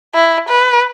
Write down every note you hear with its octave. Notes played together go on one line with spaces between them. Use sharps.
E4
B4